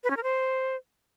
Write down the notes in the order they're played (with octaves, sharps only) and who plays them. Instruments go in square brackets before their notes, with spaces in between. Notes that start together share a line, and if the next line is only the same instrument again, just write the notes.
[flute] B4
C#4
A#4
C5